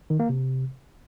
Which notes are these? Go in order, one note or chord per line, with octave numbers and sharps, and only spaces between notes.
D#3
A#3
C3